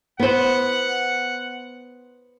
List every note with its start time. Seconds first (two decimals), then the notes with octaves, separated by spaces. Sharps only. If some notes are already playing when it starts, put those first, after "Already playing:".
0.20 B3 C5 F#5